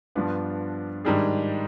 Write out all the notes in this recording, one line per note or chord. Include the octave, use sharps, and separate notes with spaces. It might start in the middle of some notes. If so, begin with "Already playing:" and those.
G2 F3 B3 D4 F4
G#2 D#3 G3 D4 G#4